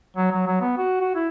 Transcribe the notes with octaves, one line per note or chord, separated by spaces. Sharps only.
F#3
F#3
F#3
B3
F#4
F#4
E4